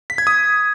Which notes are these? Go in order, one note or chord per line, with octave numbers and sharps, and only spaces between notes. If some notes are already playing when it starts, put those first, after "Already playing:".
B6
G#6
D#6